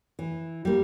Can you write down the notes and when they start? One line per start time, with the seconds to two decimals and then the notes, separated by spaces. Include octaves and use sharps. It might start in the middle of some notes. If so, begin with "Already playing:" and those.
0.19 E3
0.65 G3 A#3